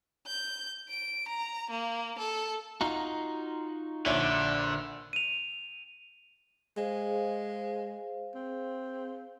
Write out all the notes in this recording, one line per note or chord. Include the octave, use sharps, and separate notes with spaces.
G6
D7
A#5
A#3
A4
D#4 F4 F#4 A#5
A#1 D3 C#5 E5
D#7 F7
G#3 G#4 C5 F5
C4